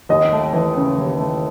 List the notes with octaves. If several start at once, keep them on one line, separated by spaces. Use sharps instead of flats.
D#2 D#5
A3
E3
C#3
D#2
A3